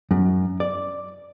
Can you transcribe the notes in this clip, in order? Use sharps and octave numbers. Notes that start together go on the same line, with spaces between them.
F#2
D5